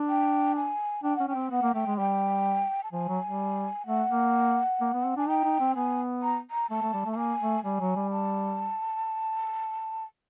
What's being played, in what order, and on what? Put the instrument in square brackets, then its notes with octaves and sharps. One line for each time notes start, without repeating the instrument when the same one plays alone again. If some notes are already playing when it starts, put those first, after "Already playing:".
Already playing: [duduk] D4
[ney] G5
G#5
[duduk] D4 [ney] G5
[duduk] C#4 [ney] F#5
[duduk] C#4 [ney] G5
[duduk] C4
[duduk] B3 [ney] F#5
[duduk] A#3
[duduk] A3 [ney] G5
[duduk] G#3
[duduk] G3 [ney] G5
[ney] A5
[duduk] F3 [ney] G#5
[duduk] F#3
G3
[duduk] A3 [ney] F#5
[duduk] A#3
A#3
B3
C4
[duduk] D4 [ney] G#5
[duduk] D#4 [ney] G5
[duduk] D#4
C4
[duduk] B3 [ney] G#5
[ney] A#5
A#5
[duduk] A3 [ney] A5
[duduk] A3
G3
A3
[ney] A5
[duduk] A#3 [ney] G#5
[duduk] A3
[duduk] G3 [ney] G#5
[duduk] F#3
G3
[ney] A5